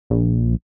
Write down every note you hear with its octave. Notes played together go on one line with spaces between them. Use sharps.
A#1